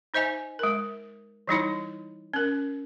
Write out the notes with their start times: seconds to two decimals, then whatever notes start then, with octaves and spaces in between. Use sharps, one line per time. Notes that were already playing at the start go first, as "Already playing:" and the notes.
0.14 D#4 C5 D#5 E5 G#5
0.59 G#3 A#4
1.48 E3 G3 D#4 E4
2.34 C#4 A#4